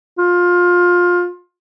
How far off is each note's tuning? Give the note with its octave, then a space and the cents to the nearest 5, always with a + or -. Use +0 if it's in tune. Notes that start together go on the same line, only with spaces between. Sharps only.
F4 +20